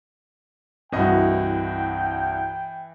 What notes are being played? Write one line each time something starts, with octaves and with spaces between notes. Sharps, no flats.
C2 G2 E3 F#4 D#5 G5